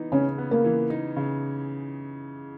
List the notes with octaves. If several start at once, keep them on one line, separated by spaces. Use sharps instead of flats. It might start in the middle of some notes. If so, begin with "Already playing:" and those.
Already playing: E3 B3 D#4
C#3 C#4
B3
A#3
E3
D#4
C#3